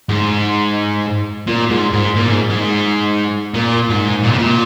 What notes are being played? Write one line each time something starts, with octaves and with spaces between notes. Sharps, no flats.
G#2
A#2
G#2
G#2
A#2
G#2
G#2
A#2
G#2
A#2
C3
A#2